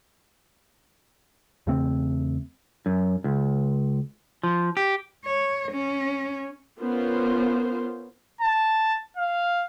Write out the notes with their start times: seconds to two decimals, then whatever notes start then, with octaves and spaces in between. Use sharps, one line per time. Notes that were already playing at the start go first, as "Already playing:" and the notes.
1.67 E2 C#3 A3 C4
2.86 F#2
3.24 C#2
4.43 F3
4.77 G4
5.25 C#5
5.72 C#4
6.80 B3 C#4 F4 A#4 C5
8.41 A5
9.17 F5